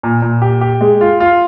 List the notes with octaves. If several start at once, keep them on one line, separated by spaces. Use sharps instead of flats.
A#2
A#2
G4
G4
G#3
F4
F4